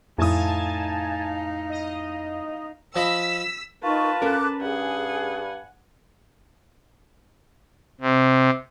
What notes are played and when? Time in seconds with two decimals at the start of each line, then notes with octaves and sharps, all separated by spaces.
0.18 F2 A2 D#4 F5 G#5 A5 D#6
1.70 D#5
2.96 F3 D#5 B5 E6 B6
3.83 D#4 F4 A#4 B4 A5 C#6
4.22 C#4 A4 A#4 D6 F#6
4.61 G2 G#4 F#5 G#5
8.01 C3